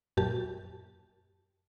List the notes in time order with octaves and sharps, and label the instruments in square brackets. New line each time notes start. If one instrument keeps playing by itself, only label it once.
[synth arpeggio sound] F#2 A#2 G4 A5